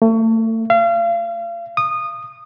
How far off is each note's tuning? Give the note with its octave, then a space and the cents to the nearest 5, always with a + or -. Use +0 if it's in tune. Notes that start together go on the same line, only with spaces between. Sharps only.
A3 +35
F5 -35
D#6 -20